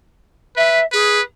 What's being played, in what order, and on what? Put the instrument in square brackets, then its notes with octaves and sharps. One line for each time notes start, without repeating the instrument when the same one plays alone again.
[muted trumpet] B4 [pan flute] E5
[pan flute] G#4 [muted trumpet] B4